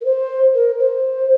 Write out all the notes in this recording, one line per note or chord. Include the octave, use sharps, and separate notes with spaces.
A#4
C5
A#4
C5